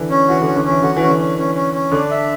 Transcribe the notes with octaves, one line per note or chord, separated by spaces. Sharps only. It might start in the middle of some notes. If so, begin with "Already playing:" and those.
Already playing: D3 E3
C#4
E3 F#4
D3
C#4
D3
E3 C#4
D3 F#4
E3
C#4
D3
C#4
E3 C#4
C#4
C#4
D3 D4
E5